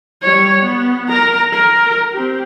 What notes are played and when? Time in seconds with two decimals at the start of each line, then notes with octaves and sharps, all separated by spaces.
0.23 G3 C#5
0.61 B3
1.09 A#4 A#5
1.53 A#4
2.13 C4 G4